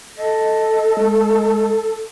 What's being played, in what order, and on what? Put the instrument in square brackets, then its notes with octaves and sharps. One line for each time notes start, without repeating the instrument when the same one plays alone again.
[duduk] A4 [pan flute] D#5
[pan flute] G#3